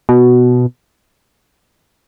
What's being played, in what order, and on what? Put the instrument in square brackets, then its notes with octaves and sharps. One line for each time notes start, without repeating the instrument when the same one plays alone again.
[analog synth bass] B2